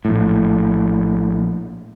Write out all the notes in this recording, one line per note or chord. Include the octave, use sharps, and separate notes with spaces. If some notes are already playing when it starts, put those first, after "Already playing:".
A#1 A2